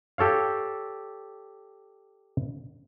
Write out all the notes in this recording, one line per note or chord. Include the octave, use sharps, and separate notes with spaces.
G4 A4 C#5 F5